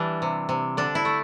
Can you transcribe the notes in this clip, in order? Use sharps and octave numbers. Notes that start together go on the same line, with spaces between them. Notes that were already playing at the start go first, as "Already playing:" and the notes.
Already playing: E3 G3 D4
C3
C3
D3 D4
E4
A3